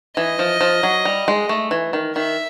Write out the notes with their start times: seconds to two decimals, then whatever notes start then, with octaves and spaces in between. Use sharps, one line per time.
0.16 E3 D#5
0.39 F3
0.61 F3
0.83 F#3
1.05 G3
1.28 G#3
1.49 A3
1.71 E3
1.93 D#3
2.16 D#3 E5